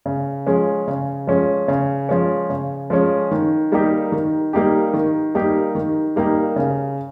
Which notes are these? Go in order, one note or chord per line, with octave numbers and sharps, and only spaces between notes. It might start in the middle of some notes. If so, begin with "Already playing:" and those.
C#3
F3 G#3 C#4
C#3
F3 G#3 C#4
C#3
F3 G#3 C#4
C#3
F3 G#3 C#4
D#3
G3 A#3 D#4 G4
D#3
G3 A#3 D#4 G4
D#3
G3 A#3 D#4 G4
D#3
G3 A#3 D#4 G4
C#3